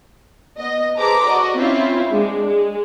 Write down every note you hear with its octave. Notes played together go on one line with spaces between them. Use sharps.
B3 D#5
G#4 A4 B4 C5 A#5 D6
F#4 D5 D#5
C4 C#4 E4 F4
G#3 D4
G#3